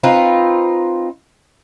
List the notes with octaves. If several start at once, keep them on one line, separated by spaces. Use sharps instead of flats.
C4 D#4 F4 B4